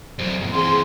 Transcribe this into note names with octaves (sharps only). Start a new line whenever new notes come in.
F#3 C4
D#2 G#2
E3 C4 G#4 C6